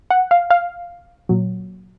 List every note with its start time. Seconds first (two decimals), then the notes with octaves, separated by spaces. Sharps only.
0.10 F#5
0.31 F5
0.50 F5
1.29 A#2 F#3